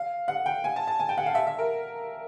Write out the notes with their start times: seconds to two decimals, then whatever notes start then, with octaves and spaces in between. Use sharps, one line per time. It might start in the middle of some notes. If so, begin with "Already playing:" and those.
Already playing: F5
0.28 F#5
0.46 G5
0.64 G#5
0.76 A5
0.87 A5
1.00 G#5
1.09 G5
1.18 F#5
1.26 F5
1.35 E5
1.47 E5
1.58 A#4